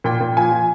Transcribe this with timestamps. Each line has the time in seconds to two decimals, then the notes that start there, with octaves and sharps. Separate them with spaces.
0.04 A#2 G5
0.20 A#2
0.37 F3 G#5
0.52 F3